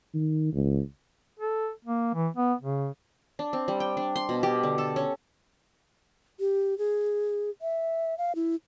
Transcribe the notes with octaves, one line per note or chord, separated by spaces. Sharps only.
D#3
C#2
A4
A#3
E3
B3
C#3
D4
C4
G3
G5
D4
C6
B2
G4
D3
A4
C#4
G4
G#4
E5
F5
E4